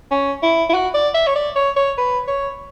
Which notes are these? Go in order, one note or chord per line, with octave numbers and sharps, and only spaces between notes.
C#4
E4
E4
F#4
D5
E5
C#5
D5
C#5
C#5
B4
C#5